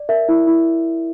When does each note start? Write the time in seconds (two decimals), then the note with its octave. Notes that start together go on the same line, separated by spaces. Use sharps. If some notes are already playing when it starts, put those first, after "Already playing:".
Already playing: D5
0.09 A#4 E5
0.29 E4
0.47 E4